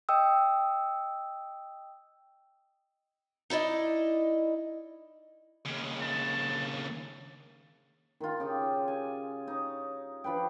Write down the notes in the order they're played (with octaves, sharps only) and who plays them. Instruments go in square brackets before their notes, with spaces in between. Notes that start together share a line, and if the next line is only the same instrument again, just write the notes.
[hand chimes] D#5 G5 D#6 E6
[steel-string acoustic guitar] D#4 E4 D5 D#5
[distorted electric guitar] D#2 C#3
[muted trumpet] A5
[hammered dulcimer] D#3 F4
C#3 G4
G#5
D#4 C#5
F3 D4 B4 G5